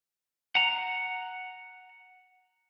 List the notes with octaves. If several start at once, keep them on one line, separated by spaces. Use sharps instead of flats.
F#5 A#5